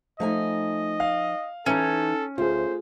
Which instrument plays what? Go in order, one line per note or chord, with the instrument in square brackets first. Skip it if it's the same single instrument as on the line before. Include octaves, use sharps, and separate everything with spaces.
[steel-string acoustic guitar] F3 D#4 G#5 [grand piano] A3 [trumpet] D#5
[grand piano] F5
[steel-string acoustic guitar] E3 D#4 [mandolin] C#4 [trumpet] A4
[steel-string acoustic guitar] D2 [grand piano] F4 G#4 [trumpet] C5